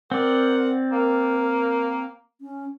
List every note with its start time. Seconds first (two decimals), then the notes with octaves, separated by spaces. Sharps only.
0.12 C4 A#4 D5 F#5
0.92 A#3 A#4
2.41 C#4